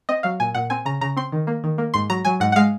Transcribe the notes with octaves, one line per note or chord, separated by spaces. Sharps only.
C4 D#5
F#3 F5
A#2 G#5
A#2 F#5
C4 G#5
C#3 A#5
C#3 A#5
C4 C6
D#3
A#3
D#3
A#3
G#2 C6
F#3 A#5
F#3 G#5
G#2 F#5
F#5
G#3 F5